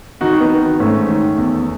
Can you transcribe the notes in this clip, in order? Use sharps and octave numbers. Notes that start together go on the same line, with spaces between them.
D#3 D#4 F#4
B3 D#4
D#3
G#2 A3 C#4
D#3
E2